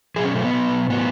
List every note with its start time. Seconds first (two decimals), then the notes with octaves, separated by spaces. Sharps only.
0.16 B2 F#3 G#4
0.24 C#4
0.35 A3
0.44 B3
0.54 B2 F#3
0.90 A2 F#3 B3